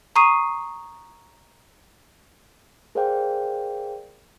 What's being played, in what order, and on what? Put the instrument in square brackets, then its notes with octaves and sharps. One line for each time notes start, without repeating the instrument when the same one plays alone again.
[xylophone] A#5 C#6 D#6 C7 D#7
[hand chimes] G#4 A#4 C5 D5 F5 G5